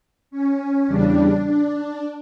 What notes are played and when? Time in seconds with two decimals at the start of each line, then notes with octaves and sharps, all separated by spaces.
0.31 C#4
0.87 E2 C#3 G3 D4
1.44 D4